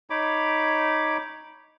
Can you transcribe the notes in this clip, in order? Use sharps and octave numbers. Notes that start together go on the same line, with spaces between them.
D#4 C#5 B5 D6